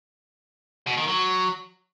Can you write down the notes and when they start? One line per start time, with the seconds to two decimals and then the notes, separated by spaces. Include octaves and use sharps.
0.87 B2
0.97 D#3
1.08 F#3